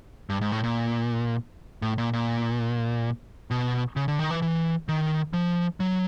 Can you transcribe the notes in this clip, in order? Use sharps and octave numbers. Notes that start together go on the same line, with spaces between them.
G2
G#2
A2
A#2
A2
A#2
A#2
B2
C#3
D3
D#3
E3
E3
D#3
F3
F#3